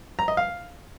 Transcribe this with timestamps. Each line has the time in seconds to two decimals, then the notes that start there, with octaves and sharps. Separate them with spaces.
0.19 A#5
0.28 D#5
0.37 F5